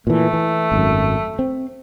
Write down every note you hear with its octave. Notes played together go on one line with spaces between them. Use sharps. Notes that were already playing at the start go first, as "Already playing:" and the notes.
A#2 E3 A3
E3
G#1 F#2
C4